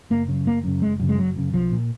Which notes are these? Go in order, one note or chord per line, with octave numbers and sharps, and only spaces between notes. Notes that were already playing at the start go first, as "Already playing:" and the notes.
F#1 A#3
F#2 C#3
F#1 A#3
F#2 C#3
F#1 G#3
F#2 C#3
G#3
F#1 F#3
F#2 C#3
B1 F3
A#2